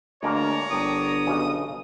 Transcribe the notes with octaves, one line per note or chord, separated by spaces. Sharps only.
D2 G#3 A#3 C#5 D5 A#5
G1 D4 G4 A#4 D#6
B1 C#3 G3